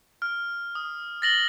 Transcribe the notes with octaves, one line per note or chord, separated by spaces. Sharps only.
F6
D#6
A6 A#6 F#7 G7